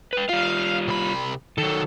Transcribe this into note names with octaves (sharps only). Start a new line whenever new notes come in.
B4 G5
G3 F4 F5
C2 B5
D#3 F#3 A4